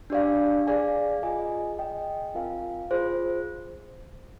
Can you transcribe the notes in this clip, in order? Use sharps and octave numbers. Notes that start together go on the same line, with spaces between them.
D4 G4 D5 F5
G#4 D5 F5 G#5
F4 G#4 D#5 G#5
G#4 D#5 G5
C4 F4 A#4 F5 G#5
F4 G#4 C5